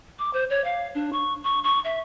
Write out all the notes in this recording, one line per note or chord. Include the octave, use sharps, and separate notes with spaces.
D6
C5
C#5
F5
D4
C#6
C#6
C#6
E5